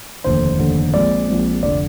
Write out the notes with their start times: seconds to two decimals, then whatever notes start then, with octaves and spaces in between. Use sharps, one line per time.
0.24 F1 D#2 D3 C5
0.59 F1 D#2 D3
0.94 A#1 A#2 G#3 C4 D5
1.28 A#1 A#2 G#3 C4
1.63 F1 D3 D5